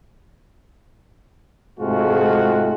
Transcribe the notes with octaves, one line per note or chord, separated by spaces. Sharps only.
G#2 C3 G#3 A3 F4 F#4